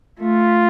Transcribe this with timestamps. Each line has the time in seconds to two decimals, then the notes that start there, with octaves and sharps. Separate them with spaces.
0.19 A3 F4